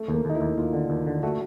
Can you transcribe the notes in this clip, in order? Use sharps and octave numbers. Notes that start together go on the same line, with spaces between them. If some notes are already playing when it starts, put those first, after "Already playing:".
Already playing: A3
D#2
A#3
D#2 D#4
E4
D#2
D#2 F4
D3
D#2
D3
A3 F#4